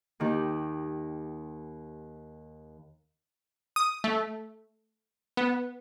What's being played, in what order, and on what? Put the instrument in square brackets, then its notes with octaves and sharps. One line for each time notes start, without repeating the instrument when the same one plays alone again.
[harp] D#2 D#3 G4
[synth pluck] D#6
A3
B3